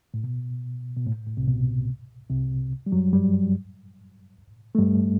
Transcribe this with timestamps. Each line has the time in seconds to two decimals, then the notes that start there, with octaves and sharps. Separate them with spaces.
0.14 A2
0.24 B2
0.97 B2
1.06 A2
1.27 A2
1.37 C2 C3
1.48 B2
2.30 C2 C3
2.86 G3
2.92 F#2 F#3
3.13 G2 G3
4.75 A3
4.78 G2 G3